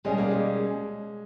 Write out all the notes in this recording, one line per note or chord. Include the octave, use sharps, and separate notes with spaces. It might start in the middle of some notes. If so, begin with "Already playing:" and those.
B2 G3 G#3 C#4 G#4
A#3
G#3